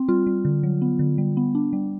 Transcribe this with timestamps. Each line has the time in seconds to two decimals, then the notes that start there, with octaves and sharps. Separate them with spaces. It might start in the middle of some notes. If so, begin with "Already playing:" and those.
Already playing: C4
0.08 G3 F4
0.27 G3
0.45 D3
0.63 F#3
0.82 B3
0.99 D3
1.18 G3
1.37 B3
1.55 D4
1.73 G3